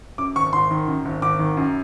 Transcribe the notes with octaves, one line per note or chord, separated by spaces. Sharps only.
F#2 D6
G#1 C#6
G#1 C6
D#3
F#2
G#1
G#1 D6
D#3
F#2